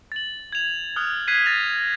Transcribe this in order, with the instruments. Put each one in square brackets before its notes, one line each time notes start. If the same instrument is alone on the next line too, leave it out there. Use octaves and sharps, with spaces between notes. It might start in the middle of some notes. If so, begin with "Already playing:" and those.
[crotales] A6 F#7
G#6 F7
D#6 F6 F#6
F#6 G#6 B6 C7 D#7
A6 A#6 F7